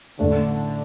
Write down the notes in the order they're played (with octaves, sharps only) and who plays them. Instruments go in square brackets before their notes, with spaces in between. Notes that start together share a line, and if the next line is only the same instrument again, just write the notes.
[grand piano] A1 A2 A3 D4 [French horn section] D3